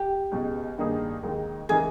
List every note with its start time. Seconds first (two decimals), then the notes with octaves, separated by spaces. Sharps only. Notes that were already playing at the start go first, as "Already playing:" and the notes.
Already playing: G4
0.32 C#2 B2 G#3
0.78 G2 D#3 A#3 D#4 G#4
1.23 D#2 D#3 G#3 D#4
1.69 C#3 E3 G#3 D#4 G#4 A#4